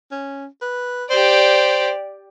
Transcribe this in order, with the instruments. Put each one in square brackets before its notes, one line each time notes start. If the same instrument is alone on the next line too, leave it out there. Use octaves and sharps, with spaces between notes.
[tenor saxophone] C#4
B4
[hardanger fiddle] G4 D5 [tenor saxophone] C5